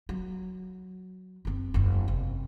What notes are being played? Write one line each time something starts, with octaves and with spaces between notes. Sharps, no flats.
F#3
F#1 C4
F#1 E2
C3